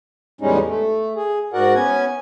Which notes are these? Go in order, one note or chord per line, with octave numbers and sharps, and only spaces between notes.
E2 A2 G3 G#3 C#4 D#4
A3
G#4
G#2 F#4 A#4 D5 F#5
B3 C#4 G#5